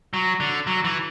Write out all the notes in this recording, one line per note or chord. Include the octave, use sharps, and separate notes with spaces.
F#3
D3
F#3
E3